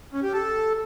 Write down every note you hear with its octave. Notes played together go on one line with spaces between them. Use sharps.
C#4
G4
A4